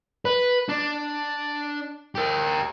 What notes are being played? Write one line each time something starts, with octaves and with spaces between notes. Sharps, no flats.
B4
D4
G4 A#4